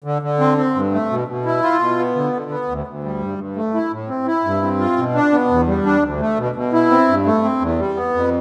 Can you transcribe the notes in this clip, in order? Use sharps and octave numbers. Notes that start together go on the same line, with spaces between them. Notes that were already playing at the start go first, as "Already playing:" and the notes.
D3
D3
C4
C4
G2
A3
B2
B2
E4
F4
B2
B3
D3
D3
B3
D2
D2
G3
G2
G2
A3
E4
A2
C4
E4
G2
C4
F4
B2
D4
B3
E2
G3
D4
D2
A3
B2
B2
E4
C4
G2
A3
C4
E2
G3
B3
F2